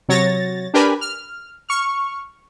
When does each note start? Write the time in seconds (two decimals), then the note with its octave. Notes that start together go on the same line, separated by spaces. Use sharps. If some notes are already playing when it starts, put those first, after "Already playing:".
0.09 C3 F#3 C#5 A6 A#6
0.74 D4 G4 A#4 B4 G#5 B5
1.01 F6
1.69 C#6 F6